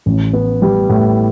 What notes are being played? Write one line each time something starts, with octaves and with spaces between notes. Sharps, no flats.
A1
B3
G3
A2